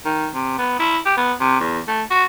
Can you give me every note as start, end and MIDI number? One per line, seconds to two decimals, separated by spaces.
0.06 0.28 51
0.34 0.56 48
0.58 0.75 59
0.79 0.98 64
1.06 1.14 67
1.17 1.33 59
1.40 1.60 48
1.60 1.79 40
1.88 2.03 57
2.11 2.24 66